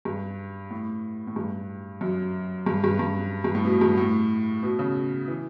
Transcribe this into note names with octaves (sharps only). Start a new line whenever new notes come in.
G2
A2
A2
G2
F#2
G2
G2
G2
G2
A2
B2
G2
A2
B2
C#3
E3